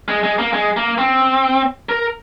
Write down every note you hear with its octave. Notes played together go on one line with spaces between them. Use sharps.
G#3
G#3
A#3
G#3
A#3
C4
A#4